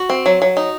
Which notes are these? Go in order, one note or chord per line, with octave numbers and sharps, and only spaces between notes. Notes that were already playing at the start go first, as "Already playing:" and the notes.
Already playing: F#4
C4
F#3
F#3
D#4